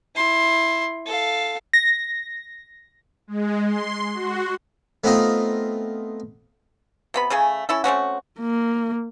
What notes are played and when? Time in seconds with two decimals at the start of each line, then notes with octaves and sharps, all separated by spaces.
0.16 E4 C6
1.07 A4 F5
1.73 A#6
3.27 G#3
3.65 C6
4.14 F#4
5.04 A3 B3 C4 D#4 F4 D#5
7.14 C3 B3 B5
7.30 C#3 A3 G#4 G#5
7.69 C#4 E4 A4
7.84 A3 C4 C#4 F#4
8.40 A#3